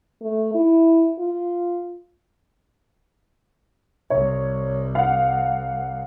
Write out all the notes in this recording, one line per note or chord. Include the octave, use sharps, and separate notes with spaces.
A3
E4
F4
C2 C#5
F5 F#5